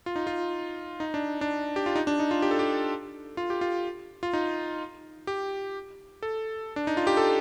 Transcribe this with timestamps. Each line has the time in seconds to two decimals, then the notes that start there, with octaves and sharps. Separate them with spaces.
0.06 F4
0.16 D#4
0.27 F4
1.00 D#4
1.14 D4
1.41 D4
1.76 G4
1.86 F4
1.95 D#4
2.07 D4
2.20 D#4
2.31 F4
2.42 G4
2.51 A4
2.59 G4
3.37 F4
3.50 G4
3.61 F4
4.23 F4
4.33 D#4
5.27 G4
6.23 A4
6.76 D4
6.87 D#4
6.97 F4
7.07 G4
7.17 A4